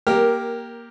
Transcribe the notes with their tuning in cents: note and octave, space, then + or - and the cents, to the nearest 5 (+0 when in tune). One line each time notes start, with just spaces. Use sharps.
A#3 +15 G4 +0 A#4 +0